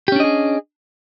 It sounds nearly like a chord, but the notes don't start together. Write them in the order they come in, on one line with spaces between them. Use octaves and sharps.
G4 C#4 D4 D#5 G#4